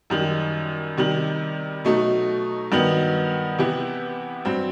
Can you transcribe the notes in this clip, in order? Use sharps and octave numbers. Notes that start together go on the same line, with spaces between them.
F#2 D#3 G3
C3 D#3 G3
B2 F#3 A3 D#4
G2 D#3 F#3 B3
C3 E3 B3 E4 G4
G2 F#3 C4